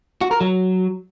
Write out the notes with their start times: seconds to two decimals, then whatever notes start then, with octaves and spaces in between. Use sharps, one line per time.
0.21 F#4
0.31 A#4
0.41 F#3